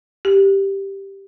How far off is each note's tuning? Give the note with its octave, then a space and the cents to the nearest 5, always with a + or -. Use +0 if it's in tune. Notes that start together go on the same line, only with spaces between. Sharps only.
G4 +0